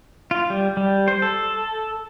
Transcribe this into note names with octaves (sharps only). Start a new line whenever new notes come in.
F4
G3
G3
C5
A4